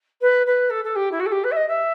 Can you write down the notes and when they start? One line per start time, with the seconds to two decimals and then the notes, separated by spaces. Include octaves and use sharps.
0.21 B4
0.46 B4
0.69 A4
0.84 A4
0.95 G4
1.11 E4
1.19 F#4
1.25 A4
1.31 G4
1.43 B4
1.51 E5
1.56 D#5
1.68 E5